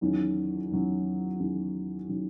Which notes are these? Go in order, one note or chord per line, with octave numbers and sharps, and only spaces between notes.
E2 D#3 F#3 C#4
E2 D#3 F#3 C#4
E2 D#3 F#3 C#4
D#3 F#3 C#4